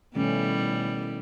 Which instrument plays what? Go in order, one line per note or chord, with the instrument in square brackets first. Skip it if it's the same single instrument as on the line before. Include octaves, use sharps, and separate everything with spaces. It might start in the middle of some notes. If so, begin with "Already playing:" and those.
[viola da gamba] B2 G3 E4 [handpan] D#3 A3 C#4